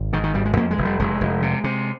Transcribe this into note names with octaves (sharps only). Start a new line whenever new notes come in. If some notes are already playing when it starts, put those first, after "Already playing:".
Already playing: G#1
G#2 D#3
D#3
G#1 G3
G#3
F2 A#3
G#3
F1
G3
F1 G#3
F1
C3
C3